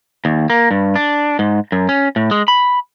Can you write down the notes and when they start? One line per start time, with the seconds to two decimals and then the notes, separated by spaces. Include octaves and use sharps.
0.25 D#2
0.50 A#3
0.71 G2
0.96 D4
1.39 G#2
1.72 F#2
1.89 C#4
2.16 A2
2.31 G#3
2.48 B5